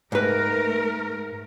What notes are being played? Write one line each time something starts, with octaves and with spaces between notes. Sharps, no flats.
G#2 A3 A#4 B4